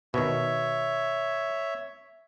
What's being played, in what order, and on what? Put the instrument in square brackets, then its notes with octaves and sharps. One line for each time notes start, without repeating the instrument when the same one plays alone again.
[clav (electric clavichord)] B2 D#3 [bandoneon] C#5 E5